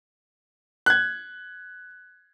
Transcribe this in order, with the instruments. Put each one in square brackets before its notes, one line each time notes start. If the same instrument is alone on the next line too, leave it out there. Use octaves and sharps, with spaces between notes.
[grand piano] F#6 G#6